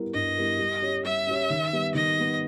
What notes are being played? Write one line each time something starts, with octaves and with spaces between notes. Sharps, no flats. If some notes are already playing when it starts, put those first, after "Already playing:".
Already playing: G3 B3 E4 A#4
G2 D#5
G3 B3 E4 A#4
G3
C#4 G4 C#5
G3 E5
C#4 G4 C#5
D#3
G3 B3
D#3 D#5
G3 B3